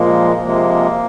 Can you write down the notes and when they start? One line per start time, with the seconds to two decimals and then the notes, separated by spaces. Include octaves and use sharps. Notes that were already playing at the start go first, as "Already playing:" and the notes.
Already playing: A#2 F3 G#3 A#3
0.44 C3 F3 G#3 A#3